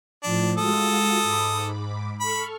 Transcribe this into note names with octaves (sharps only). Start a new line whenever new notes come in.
A2 F3 D4
G#3 F4 F#4 A4 D#6
G#2 B5 D6
A4 B5 C#6 F6